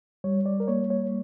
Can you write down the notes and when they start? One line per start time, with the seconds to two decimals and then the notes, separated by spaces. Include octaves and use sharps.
0.24 G3 C#5
0.46 D5
0.60 A#4
0.68 A#3 C#5
0.90 C#5